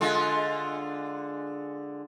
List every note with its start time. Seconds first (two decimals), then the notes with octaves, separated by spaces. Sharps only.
0.01 D3 G#3 F4